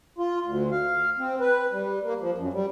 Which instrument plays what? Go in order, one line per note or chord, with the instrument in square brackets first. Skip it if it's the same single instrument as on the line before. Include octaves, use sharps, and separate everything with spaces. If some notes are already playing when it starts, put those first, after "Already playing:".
[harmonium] F4
D2
F5
C4
B4
G3
A#3
F3
F#2
G3